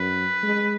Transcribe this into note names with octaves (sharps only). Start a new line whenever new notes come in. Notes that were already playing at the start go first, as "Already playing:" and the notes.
Already playing: F#2 B4
G#3